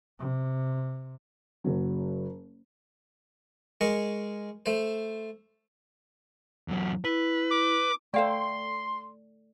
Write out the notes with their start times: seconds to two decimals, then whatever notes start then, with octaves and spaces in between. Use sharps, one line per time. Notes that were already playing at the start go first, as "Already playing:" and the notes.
0.19 C3
1.64 F#1 F#3
3.81 G#3 A#4 C#6
4.66 A3 C5
6.68 E2 F#3
7.05 E4 B4
7.51 D6
8.14 A3 A4 C5 D5 F5 G5 C6